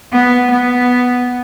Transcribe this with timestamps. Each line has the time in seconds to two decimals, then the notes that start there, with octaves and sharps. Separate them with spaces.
0.13 B3
0.51 B3